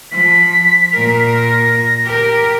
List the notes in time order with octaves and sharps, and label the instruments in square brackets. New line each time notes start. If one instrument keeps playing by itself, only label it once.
[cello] F3 [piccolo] B6
[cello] A#2 A#4
[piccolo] A#6
[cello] G4 A#4